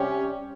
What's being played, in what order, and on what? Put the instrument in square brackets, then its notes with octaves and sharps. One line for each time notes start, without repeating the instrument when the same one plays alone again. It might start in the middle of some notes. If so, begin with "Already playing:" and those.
Already playing: [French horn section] C3 G3 C#4 G4